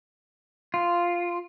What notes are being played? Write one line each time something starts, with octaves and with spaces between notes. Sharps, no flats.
F4